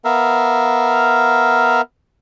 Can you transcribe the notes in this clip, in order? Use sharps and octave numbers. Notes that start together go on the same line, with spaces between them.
B3 A#4 E5 F5